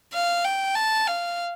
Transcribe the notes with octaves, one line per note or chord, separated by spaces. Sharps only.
F5
G5
A5
F5